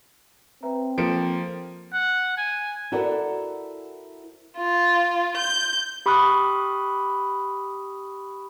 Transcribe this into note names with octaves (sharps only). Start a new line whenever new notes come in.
C4 B4 E5 A#5
F3 A#3 A4 A#4 C6 C#7 D7 E7
F#5
G#5
E4 F#4 A4 A#4 C5 D5
F4
G6
G4 B5 C#6 D#6 F6 F#6